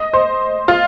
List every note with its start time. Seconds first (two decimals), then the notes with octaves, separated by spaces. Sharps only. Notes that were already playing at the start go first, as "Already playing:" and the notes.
Already playing: D#5
0.13 C5
0.68 F4